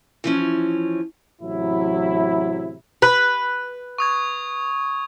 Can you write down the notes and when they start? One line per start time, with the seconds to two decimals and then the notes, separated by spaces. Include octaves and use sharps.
0.24 E3 F3 C#4
1.40 A1 C3 F#3 E4
3.02 B4
3.98 C#6 D#6 G#6